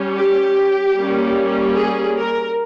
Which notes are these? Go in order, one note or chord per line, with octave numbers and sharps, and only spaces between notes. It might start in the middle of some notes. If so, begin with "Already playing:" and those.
Already playing: G3 C#4
G4
G3 A#3 C#4
G#4
A#4